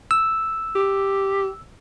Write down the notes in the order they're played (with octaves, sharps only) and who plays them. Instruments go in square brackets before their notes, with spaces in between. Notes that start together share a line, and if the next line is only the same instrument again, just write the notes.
[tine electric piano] E6
[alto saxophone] G4